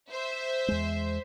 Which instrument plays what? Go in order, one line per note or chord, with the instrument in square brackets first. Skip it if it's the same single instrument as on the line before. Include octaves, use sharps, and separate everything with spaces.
[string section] C5 E5
[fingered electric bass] E2 G#3